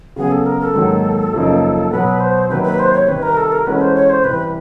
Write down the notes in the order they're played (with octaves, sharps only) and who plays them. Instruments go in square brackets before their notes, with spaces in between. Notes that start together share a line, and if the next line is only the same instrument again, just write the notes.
[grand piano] C#3 F#3 B3 [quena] G#4
[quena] A4
A#4
A4
[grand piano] G#2 D#3 F#3 A#3
F#2 C#3 F3 A#3 D#4
[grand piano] B2 F#3 B3 [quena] B4
[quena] C5
[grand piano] C3 D#3 F#3 A#3 [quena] B4
[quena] B4
C5
C#5
[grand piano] C3 D#3 G3 [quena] B4
[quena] A#4
A4
A#4
[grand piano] E3 G#3 C#4 F#4 A4 [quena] B4
[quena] C5
C#5
C5
[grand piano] C3 E3 G3 [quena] B4